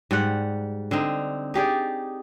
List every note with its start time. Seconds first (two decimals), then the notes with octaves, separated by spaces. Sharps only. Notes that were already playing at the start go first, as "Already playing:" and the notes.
0.11 G#2 G3 F#5
0.91 D3 C4 D#4
1.54 D#4 G4 G#4 D5